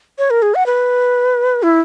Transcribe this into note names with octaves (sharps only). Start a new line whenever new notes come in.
C#5
A#4
G#4
F#5
B4
E4